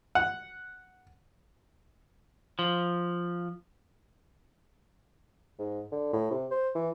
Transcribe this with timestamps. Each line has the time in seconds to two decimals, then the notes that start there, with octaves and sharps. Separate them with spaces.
0.15 F#5
2.59 F3
5.59 G#2
5.92 D3
6.13 A2
6.31 C3
6.51 C5
6.75 E3